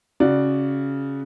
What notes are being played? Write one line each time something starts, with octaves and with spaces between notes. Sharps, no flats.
C#3 F#4 D5